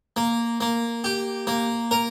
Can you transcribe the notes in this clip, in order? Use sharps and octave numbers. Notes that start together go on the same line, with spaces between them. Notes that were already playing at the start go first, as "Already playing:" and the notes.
A#3
A#3
G4
A#3
A#4